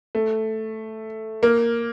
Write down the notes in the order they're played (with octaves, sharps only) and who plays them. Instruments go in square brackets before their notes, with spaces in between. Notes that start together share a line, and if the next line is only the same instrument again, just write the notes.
[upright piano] A3
A#3